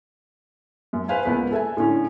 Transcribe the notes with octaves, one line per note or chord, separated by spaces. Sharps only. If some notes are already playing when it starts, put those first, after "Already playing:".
F#2
B4 C5 F5 G#5
C#2 A#3 B3 B4
A4 E5 G#5
A2 D3 C#4